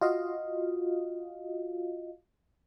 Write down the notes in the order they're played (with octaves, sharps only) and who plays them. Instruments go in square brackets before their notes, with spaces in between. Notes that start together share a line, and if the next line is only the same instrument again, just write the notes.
[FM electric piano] F4 F#4 D#5 F5